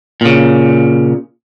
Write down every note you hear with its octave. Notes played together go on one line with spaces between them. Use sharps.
A#2 C#3